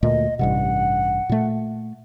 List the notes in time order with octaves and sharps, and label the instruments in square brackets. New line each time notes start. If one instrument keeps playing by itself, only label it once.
[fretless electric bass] D2 A#2 A3 [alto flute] D#5
[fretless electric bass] A1 G2 C3 [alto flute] F#5
[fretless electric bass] A#2 A3